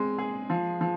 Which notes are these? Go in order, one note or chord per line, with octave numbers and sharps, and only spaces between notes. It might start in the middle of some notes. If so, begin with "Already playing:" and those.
Already playing: G#3 C4
G#4
F3
F3